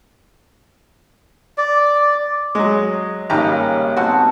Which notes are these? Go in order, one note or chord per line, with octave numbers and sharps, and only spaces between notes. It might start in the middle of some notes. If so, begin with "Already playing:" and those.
D5
F#3 G#3 D#5
G#1 C#3 G3 A#3 G4 A#5
B2 C4 F#4 A5